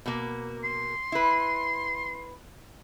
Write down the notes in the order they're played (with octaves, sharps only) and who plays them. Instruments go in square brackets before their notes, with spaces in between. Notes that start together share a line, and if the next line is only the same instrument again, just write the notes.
[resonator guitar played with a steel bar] B2 A#3
[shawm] C6
[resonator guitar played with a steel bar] E4 B4